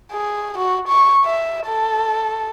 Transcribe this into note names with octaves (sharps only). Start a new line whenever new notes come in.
G#4
F#4
C#6
E5
A4